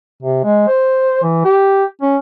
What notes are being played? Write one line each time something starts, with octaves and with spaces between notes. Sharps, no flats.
C3
G#3
C5
E3
G4
C#4